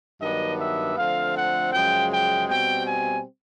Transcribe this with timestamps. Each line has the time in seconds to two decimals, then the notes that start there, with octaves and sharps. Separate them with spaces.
0.21 G2 D#3 F#3 B3 D4 D#5
0.60 E5
0.98 D3 F3 A3 C4 F5
1.36 F#5
1.73 F#2 C#3 F3 G#3 G5
2.11 G5
2.49 B2 G3 C4 G5
2.86 G#5